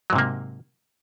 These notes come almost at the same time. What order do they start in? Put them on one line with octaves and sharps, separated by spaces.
F#3 G#2 C3 A#3